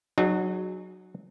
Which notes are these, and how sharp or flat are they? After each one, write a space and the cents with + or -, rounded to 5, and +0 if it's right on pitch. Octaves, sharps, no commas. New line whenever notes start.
F#3 +0 D#4 -40 G#4 +0